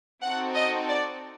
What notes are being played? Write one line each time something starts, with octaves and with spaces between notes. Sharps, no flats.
C4 D#4 F#4 A4 F#5
D#5
D5